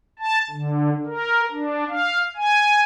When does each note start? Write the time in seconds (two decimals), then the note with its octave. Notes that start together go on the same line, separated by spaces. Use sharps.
0.19 A5
0.51 D3
1.06 A#4
1.51 D4
1.89 F5
2.36 G#5